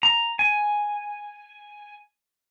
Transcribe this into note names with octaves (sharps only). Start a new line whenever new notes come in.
A#5
G#5